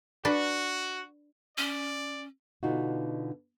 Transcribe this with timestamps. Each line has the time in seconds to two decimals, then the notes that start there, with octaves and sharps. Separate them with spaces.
0.25 D4 F#4 B4
1.57 C#4 D5
2.63 B2 D3 D#4 F4 F#4